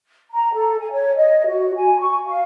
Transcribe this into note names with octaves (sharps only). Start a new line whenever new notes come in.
A#5
A4
G#5
C#5
D#5
F#4
G#5
C#6
F5